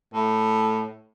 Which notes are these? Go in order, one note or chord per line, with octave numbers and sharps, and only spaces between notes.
A2